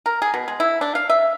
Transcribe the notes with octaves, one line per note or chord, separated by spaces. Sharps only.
A#4
G#4
B2
G#3
E4
D4
F5
E5